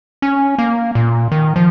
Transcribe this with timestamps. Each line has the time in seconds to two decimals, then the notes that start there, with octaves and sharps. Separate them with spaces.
0.22 C#4
0.59 A#3
0.95 A#2
1.32 D#3
1.56 F3